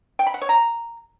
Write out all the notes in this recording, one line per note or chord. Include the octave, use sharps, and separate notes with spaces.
G5
B5
F#5
C#5
A#5